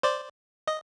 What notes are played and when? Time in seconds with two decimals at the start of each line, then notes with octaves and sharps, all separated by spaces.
0.03 C5 D5
0.67 D#5